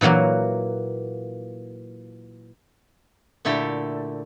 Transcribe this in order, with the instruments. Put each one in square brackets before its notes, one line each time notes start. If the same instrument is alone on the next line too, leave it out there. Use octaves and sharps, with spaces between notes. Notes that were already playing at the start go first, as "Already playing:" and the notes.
[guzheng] A#2 E3 F#3 A#3 F#4
[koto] A#2 D3 A3 E4 G4 A4